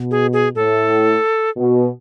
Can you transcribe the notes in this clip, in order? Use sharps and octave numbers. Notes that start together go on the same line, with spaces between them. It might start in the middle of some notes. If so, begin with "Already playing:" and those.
Already playing: B2
G#4
G#4
A2 A4
B2